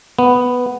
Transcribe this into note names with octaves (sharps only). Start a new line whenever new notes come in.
B3